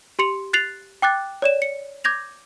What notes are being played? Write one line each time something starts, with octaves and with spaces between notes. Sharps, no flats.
G4 C6 C#7 F7
F#6 A6 C7 F7 F#7
G5 D6 F#6 A6
C#5 D5 E7
C#7
D6 G6 G#6 A#6 F7